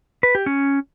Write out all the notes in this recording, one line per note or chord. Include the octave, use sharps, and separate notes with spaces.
B4
G4
C#4